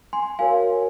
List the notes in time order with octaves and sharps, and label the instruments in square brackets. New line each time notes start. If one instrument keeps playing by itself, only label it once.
[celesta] G#5 C6
F#4 A#4 C#5 F5 G#5